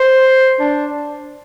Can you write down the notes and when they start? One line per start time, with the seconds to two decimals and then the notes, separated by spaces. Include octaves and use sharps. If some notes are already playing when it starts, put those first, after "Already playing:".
Already playing: C5
0.60 D4